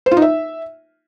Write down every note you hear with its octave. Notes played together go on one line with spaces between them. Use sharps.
C5
F4
D#4
E5